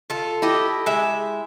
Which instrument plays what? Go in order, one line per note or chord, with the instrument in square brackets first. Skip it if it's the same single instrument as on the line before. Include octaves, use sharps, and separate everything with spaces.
[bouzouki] F4 A4
[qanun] E4 G4 D#5
[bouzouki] G#3 E5